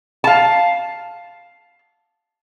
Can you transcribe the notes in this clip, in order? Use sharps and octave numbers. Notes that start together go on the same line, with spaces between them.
F5 A5